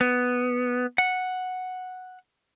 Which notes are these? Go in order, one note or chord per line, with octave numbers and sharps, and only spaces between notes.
B3
F#5